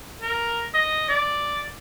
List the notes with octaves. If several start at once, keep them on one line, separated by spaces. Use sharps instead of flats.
A#4
D#5
D5